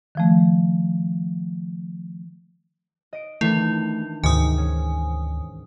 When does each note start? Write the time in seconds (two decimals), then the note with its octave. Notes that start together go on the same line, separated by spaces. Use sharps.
0.15 D#3 F3 A3
3.13 D#5 D7
3.41 D#3 E3 A3 D4 E4
4.24 D2 G#2 C3 D#3 G#5 D#6
4.58 C#4